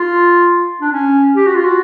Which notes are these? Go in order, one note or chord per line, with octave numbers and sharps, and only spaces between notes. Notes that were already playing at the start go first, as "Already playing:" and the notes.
Already playing: F4
D4
C#4
G4
F#4
F4
F#4